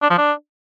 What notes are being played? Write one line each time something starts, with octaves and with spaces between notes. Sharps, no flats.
D4
F3
D4